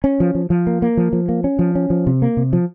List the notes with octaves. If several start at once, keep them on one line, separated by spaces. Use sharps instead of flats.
C#4
F3
F3
F3
A#3
A#3
F3
F3
A#3
C#4
F3
C#4
F3
C3
A#3
C3
F3